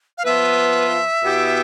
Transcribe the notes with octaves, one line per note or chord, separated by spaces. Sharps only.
F5
F3 B3 F4 B4 E5
B2 B3 E4 G4